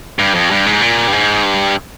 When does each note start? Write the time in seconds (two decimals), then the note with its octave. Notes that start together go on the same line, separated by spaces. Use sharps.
0.19 G2
0.35 F2
0.51 G2
0.66 G#2
0.82 A#2
1.07 G2
1.13 G#2
1.43 G2